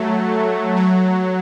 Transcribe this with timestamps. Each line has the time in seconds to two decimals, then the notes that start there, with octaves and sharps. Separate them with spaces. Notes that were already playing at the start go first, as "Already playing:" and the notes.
Already playing: F#3 A3
0.76 F#3